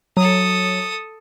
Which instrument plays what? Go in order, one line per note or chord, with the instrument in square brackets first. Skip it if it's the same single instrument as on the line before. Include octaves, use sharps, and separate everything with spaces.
[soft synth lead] F#3 [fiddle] A4 D#6